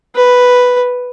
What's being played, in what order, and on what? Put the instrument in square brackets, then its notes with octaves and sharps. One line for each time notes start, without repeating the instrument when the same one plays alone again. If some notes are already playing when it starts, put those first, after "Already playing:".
[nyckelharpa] B4